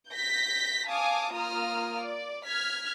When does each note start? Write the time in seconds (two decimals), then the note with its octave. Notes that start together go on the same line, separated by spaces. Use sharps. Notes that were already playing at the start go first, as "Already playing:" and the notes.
0.11 G6 A#6 B6
0.88 F5 G#5 A5 D6 D#6
1.34 A#3 F4 A#5 D#6 F6
2.00 D5
2.47 F6 G#6 B6